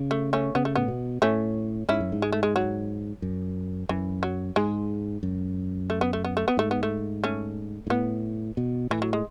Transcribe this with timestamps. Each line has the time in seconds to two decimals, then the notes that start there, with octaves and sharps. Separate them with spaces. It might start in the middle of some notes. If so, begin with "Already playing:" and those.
Already playing: C#3
0.11 A3
0.33 A3 C#4
0.55 C#3 B3
0.65 A3
0.76 A2 B3
0.88 B2
1.22 A2 A3 C#4
1.89 G#2 C#4 E4
2.00 F#2
2.12 G#2
2.22 G#3
2.33 A3
2.43 G#3
2.56 F#3
3.22 F#2
3.89 F#2 E3
4.23 F#3
4.56 G#2 G#3
5.23 F#2
5.90 A3
6.01 B3
6.13 A3
6.25 B3
6.37 A3
6.48 B3
6.57 G#2 A3
6.71 B3
6.83 A3
7.24 A3 C#4
7.87 G#2
7.90 A2 B3
8.57 B2
8.90 A2 E3
9.02 F#3
9.13 G#3